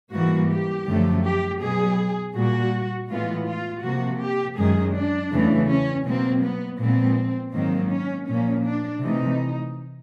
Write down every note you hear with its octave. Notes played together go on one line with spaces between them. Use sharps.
G#2 E3 G3 A#3 F#4
G4
F#2 D3 F3 A3
G4
B2 F#3 B3 G#4
A#2 G3 A#3 F#4
A2 E3 G#3 B3 F4
F4
C3 F3 A#3 F#4
G4
F#2 D#3 G#3 G#4
D4
E2 C#3 E3 A3
C#4
B2 F#3 A#3 C4
B3
A#2 F3 G#3 B3 C4
G#2 D#3 F#3 A#3 C4
C#4
A#2 F3 A#3 C#4
D4
C3 E3 A3 D#4